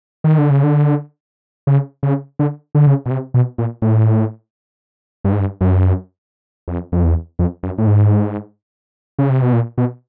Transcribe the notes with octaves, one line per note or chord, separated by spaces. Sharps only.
D#3
D3
C#3
D3
C#3
C#3
D3
D3
C#3
B2
C3
B2
A#2
A2
G2
G#2
G2
F#2
F2
F2
E2
F2
F#2
A2
G#2
C#3
C3
B2
A#2
B2